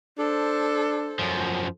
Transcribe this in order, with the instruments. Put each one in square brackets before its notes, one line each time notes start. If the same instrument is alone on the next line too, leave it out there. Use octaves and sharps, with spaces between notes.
[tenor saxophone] D4 [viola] A4 C5
[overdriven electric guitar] F#2 F3